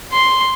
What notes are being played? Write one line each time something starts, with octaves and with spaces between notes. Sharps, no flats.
C6